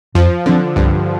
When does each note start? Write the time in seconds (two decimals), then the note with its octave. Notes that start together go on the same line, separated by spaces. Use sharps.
0.15 F2 F3
0.46 D3 F3 C4
0.76 C2 G2